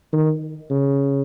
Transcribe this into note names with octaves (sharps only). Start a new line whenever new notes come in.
D#3
C#3